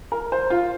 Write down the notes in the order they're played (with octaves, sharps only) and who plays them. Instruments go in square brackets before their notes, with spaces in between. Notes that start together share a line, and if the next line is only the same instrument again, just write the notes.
[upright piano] A#4
C5
F4